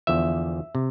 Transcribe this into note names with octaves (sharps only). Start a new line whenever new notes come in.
E2 D3 F3 E5
C3